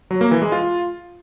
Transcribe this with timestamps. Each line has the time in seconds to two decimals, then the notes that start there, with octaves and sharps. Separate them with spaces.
0.11 F#3
0.21 A#3
0.31 E3
0.42 G#3
0.52 F4